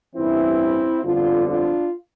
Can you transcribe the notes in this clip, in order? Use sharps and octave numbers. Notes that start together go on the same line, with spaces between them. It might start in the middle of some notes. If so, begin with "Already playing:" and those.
A1 G2 E3 C4 E4
G1 F2 D3 F3 D4 F4
D4 F4